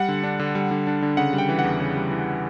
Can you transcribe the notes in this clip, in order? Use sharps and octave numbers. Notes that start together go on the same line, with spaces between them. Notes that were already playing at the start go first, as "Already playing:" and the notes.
Already playing: G3 F#5
D3
D4
D3
G3
D3
D4
D3
C#3 F#5
G3
G5
E3
F#5
E2
C#3
G3
E3